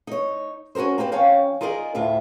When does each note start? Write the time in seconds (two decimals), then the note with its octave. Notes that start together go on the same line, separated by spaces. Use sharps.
0.07 D#4 C#5
0.75 C#4 F#4 G#4 A#4 C5
0.98 A#3 C4 G4 B4
1.12 F3 C#4 C#5 F5 G5
1.61 D#4 F4 G#4 A#4 D5 D#5
1.95 D2 A2 F4 E5